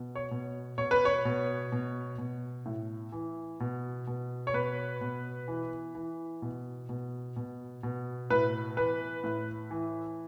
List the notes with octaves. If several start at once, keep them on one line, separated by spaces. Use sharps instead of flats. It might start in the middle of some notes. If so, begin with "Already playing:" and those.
Already playing: B2
C#5
B2
B2 C#5
B4
C#5
B2
B2
B2
A2
E3
B2
B2
C#5
B2 B4
B2
E3
E3
B2
B2
B2
B2
A2 B4
E3 B4
A2
E3